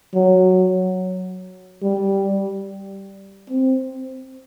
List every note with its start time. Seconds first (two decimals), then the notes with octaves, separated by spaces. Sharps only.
0.14 F#3
1.83 G3
3.50 C4